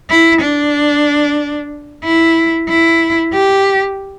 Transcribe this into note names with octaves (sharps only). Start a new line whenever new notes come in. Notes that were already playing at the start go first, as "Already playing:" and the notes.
E4
D4
E4
E4
G4